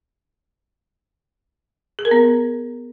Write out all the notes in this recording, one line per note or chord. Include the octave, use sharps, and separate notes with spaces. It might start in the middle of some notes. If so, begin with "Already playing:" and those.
G#4
A#4
B3